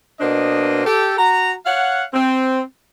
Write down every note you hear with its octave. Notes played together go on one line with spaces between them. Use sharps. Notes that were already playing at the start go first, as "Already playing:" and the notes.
B2 A#3 D4 C5 D#5
G4 A4
F#4 A#5
C#5 F5 F#5
C4